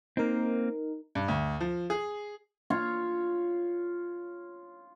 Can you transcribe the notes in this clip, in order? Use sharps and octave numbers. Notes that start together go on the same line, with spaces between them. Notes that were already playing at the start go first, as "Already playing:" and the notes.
A#3 C4 D#4 A#4
G2
D2
F3
G#4
F4 C#5